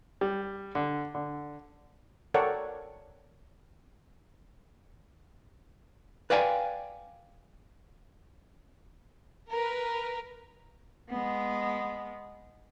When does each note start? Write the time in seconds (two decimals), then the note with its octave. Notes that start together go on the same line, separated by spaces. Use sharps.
0.21 G3
0.75 D3
1.15 D3
2.34 A4 A#4 C#5 D5 F#5 G5
6.30 B4 D5 F5 G5 G#5
9.51 A#4 B4
11.09 G#3 B3